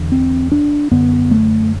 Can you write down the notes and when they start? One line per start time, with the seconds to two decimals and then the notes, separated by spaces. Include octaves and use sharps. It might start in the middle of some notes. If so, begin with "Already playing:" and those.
Already playing: E2 D3
0.12 C4
0.52 D4
0.91 F#2 D3 B3
1.31 A3